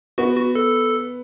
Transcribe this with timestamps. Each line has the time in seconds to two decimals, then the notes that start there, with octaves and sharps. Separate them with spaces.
0.18 B3 F#4
0.37 F#4
0.55 A4